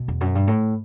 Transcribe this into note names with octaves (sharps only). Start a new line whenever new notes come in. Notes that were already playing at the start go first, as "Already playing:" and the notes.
Already playing: B2
E2
F#2
G2
A2